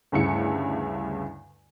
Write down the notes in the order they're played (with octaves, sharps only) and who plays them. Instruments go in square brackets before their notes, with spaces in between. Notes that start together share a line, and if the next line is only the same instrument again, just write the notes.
[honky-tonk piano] D2 G2 C#3 E4 C#7